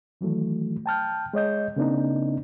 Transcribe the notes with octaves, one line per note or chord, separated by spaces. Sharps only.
D#3 E3 F#3 A3
G5 A5 F6 G6
G#3 C#5 D#5 G6
C#3 A#3 C4 D4 D#4